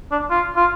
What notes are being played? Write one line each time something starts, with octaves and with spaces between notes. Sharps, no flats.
D4
F4
F4